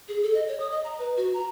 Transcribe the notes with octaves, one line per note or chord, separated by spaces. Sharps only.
G#4
A4
D#5
C#5
D#6
D#5
A#5
B4
F#4
A#5